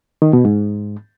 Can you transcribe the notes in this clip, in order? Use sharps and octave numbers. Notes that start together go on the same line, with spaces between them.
D#3
B2
G#2